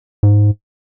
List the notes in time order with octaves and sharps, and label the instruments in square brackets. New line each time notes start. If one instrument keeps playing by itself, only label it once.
[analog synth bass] G#2